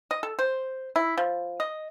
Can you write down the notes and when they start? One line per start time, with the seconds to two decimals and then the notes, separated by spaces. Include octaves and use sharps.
0.11 D#5
0.23 A4
0.39 C5
0.96 E4
1.18 F3
1.60 D#5